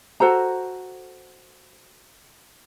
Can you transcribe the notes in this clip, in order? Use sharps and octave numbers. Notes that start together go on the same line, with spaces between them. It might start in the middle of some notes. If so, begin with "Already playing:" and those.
F#4 A4 C5 A#5